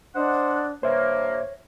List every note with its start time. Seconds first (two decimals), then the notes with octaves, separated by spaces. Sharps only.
0.15 D4 C5 D#5 F#5
0.83 G2 A#3 C5 C#5 E5